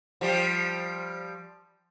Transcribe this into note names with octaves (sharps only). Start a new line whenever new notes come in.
F3 G3 G4